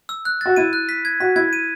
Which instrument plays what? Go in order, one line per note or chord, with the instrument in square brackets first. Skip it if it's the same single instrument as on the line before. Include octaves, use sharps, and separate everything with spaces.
[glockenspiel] E6
F#6
[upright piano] F#4 [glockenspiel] A6
[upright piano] E4 [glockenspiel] D#7
[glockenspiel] F#6
B6
G#6
[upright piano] F#4 [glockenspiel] B6
[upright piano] E4 [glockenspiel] G#6
[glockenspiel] D#7